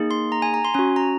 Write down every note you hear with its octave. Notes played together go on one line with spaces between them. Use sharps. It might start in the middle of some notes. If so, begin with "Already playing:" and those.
Already playing: A#3 D#4 G#4
C6
A#5
G#5
A#5
C6
C#4 F#4 G#5
A#5